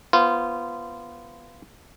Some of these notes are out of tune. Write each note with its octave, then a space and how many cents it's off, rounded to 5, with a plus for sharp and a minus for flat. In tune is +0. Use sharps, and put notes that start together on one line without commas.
B3 -15 F4 -20 C5 +0